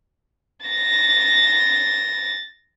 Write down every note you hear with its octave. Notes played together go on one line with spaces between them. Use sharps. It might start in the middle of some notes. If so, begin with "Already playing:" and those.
A6 A#6